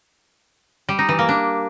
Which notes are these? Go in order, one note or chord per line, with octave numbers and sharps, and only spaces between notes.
G3
D#4
E3
A#3
D4